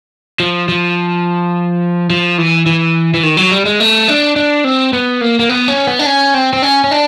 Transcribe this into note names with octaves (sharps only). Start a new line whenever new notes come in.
F3
F3
F3
E3
E3
E3
D#3
F#3
G3
G#3
A3
D4
D4
C4
B3
A#3
A#3
B3
C#4
B3
D4
C#4
C4
C4
C#4
C#4
D4